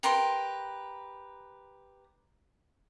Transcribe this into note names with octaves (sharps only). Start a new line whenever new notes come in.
G4 A#4 B4 C6